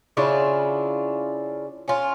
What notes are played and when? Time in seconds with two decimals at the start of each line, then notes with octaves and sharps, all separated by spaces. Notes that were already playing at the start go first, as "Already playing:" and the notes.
0.17 C#3 D4 E4 F4
1.88 C#4 F4